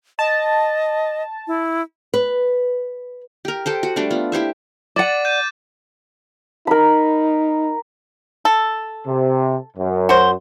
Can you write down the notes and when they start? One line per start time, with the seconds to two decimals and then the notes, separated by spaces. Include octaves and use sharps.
0.19 D#5 A5
1.47 E4
2.14 B4
3.45 G4 A#4
3.66 G4 A4 C5
3.83 F#4
3.96 G3 A3 D4
4.11 B3 F4
4.32 E4 G4 C5 E5
4.96 D5 F#5 D6 A6 D#7
5.25 G6 D#7
6.67 D#4 A#4 B5
8.45 A4
9.06 C3
9.77 F#2
10.09 F#4 C5